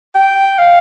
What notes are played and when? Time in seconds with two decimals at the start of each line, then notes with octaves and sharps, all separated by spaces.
0.15 G5
0.58 F5